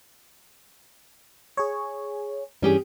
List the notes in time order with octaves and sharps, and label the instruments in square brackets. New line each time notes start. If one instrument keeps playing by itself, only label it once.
[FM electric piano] G#4 C#5
[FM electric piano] G2 E3 G3 [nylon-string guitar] C#4 G4 G#4